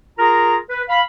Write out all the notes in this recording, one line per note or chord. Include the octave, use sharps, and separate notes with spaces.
F4 G#4 A#4 A#5
B4
F5 B5